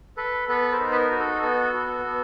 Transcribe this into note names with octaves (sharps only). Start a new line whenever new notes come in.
A4 B4
B3 A4 B4
A#4 C5
D#4
B4
A#4
F#4
A4
B3 A4
F#4
B3